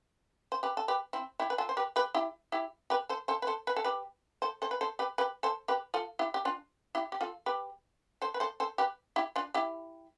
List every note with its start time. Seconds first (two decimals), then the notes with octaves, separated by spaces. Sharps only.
0.52 C5
0.63 G4 B4
0.77 A4
0.88 G4 B4
1.13 C4 E4
1.40 E4 G4
1.50 B4
1.58 F4 A4
1.69 C5
1.77 G4 B4
1.96 G4 B4
2.14 E4 G4
2.52 E4 G4
2.90 G4 B4
3.09 A4 C5
3.28 A4 C5
3.42 B4
3.47 A4 C5
3.67 B4
3.76 A4
3.84 G4 B4
4.42 A4 C5
4.62 A4 C5
4.71 B4
4.81 A4 C5
4.99 G4 B4
5.18 G4 B4
5.43 A4 C5
5.68 G4 B4
5.94 F4 A4
6.19 E4 G4
6.34 G4
6.45 D4 F4
6.95 E4 G4
7.12 G4
7.21 F4 A4
7.46 G4 B4
8.22 A4 C5
8.34 B4
8.40 A4 C5
8.60 A4 C5
8.78 G4 B4
9.16 E4 G4
9.36 D4 F4
9.54 E4 G4